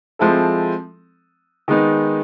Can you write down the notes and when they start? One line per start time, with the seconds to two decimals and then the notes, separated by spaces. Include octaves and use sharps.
0.19 F3 G#3 C4 E4 A4
1.68 D#3 G#3 B3 D#4